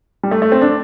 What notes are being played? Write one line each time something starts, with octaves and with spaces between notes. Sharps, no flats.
G3
A3
A3
C4
D4